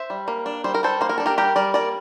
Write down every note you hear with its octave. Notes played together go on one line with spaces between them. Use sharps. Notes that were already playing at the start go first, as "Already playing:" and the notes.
Already playing: C5 E5
G3
A#3
D4
G3 C5
A#4
G3 A4 C5
A#3 C5
A#4
D4 A4
G4 A#4
G3 G4 A#4
G3 A#4 D5
A#3 A#4 D5